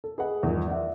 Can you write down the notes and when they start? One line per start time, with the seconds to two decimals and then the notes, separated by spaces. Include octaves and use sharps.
0.04 A4
0.18 G#4 B4 D#5 F#5
0.43 E2 G2 D#3 F3
0.68 D5 E5 F#5